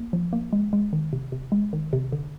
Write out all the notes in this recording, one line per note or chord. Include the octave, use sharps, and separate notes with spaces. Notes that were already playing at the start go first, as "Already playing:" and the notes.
Already playing: A#3
F3
A#3
G#3
G#3
D#3
C3
C3
G#3
D#3
C3
D3